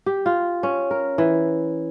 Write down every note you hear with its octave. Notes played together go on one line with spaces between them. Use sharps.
G4
F4
C#4
A#4
E3